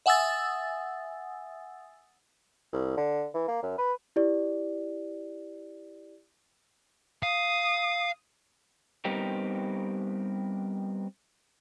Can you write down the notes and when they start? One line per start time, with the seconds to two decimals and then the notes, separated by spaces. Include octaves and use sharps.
0.06 E5 F#5 G#5 D#6 E6 A6
2.73 C2
2.97 D3
3.34 E3
3.48 A#3
3.63 F#2
3.78 B4
4.16 E4 G4 D5
7.23 F5 D#6
9.05 G3 B3 C4 D#4 G4 A#4